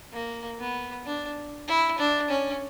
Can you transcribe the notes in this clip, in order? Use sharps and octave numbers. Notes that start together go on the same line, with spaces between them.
A#3
B3
D4
E4
D4
C#4